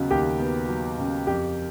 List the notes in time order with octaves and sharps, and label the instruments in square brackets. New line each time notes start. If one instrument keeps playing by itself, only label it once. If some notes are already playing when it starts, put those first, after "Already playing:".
Already playing: [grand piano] D#2 C#3 F#3 B3 F#4
D#2 G4
B3
F#3
C#3
F2 G4